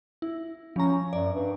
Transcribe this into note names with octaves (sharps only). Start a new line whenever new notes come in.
E4
F3 C#4 A#5
F#2 D5
G2